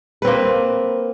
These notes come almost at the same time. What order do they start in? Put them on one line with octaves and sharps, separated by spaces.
B4 C4 A#3